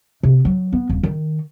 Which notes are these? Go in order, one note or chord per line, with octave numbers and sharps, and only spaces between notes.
C3
F#3
B3
D#1
D#3